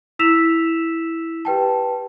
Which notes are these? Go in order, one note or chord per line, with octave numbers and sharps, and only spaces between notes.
E4 E6 B6 E7 F7
G4 B4 G5 A5